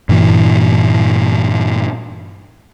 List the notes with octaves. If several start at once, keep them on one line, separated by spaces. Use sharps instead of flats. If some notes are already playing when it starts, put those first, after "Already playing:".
G2 A#2 E3